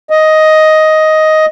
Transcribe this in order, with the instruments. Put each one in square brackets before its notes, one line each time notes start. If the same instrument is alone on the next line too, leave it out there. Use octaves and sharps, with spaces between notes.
[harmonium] D#5